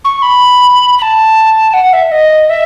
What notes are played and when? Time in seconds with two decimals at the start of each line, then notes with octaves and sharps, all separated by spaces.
0.05 C#6
0.22 B5
0.98 B5
1.02 A5
1.73 F#5
1.93 E5
2.12 D#5
2.49 E5